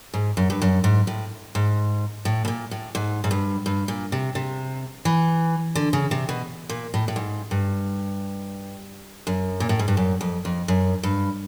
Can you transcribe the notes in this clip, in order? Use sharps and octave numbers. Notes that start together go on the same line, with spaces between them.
G#2
F#2
G2
F#2
G#2
A2
G#2
A2
B2
A#2
A2
G#2
G#2
G2
G2
A#2
C3
C3
E3
D3
C#3
C3
B2
A#2
A2
A2
G#2
G2
F#2
A#2
A2
G#2
G2
F#2
F2
F2
F#2
G2